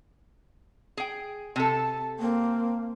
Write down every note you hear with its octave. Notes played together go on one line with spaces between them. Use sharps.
G#4 G5
C3 A4 A5
A#3 C4